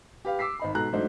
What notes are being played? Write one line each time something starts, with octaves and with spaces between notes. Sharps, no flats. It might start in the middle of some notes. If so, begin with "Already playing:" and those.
G4 B4 F5
D6 E6 B6 C7
G#1 D#4 B5
G#2 B2 A4 A#5 F#6
G#2 F#3 A3 D4 D#4 C5